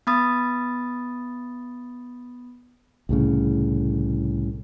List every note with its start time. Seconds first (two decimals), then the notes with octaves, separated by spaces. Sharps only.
0.07 B3 B5 D#6 A6
3.09 C2 A2 C#3